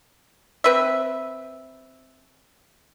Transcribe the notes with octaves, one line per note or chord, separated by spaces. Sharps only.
C4 B4 E5